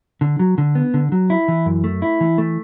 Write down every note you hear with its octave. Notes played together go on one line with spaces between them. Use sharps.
D3
F#3
D3
B3
D3
F#3
E4
E3
F#2
A3
E4
E3
A3